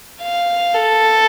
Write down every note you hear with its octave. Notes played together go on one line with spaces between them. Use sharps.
F5
A4